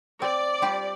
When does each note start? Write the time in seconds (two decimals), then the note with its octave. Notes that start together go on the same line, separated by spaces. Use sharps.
0.22 C4 D5
0.62 G3 F4 G4